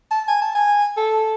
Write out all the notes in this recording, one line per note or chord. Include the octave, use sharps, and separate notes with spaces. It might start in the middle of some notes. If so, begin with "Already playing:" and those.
A5
G#5
A5
G#5
A4